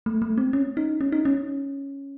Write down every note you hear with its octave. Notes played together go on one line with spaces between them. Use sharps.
A3
A3
C4
C#4
D#4
C#4
D#4
C#4